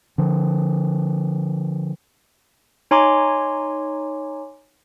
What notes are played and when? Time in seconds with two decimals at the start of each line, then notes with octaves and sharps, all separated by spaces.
0.18 D3 F3
2.91 D#4 C#5 G#5 A#5 C6 D6